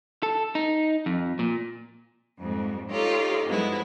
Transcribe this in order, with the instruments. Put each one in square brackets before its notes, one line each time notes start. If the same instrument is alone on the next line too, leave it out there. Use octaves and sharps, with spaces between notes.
[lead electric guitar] A4
D#4
F2
A#2
[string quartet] F2 G#2 G3
D#4 F4 G4 A4 C#5 D5
G2 F3 F#3 G#3 B3 E4